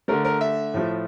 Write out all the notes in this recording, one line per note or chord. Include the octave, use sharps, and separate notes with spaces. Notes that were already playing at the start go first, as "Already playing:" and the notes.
D3 A3 A#4
A#4
E5
A2 F3 A3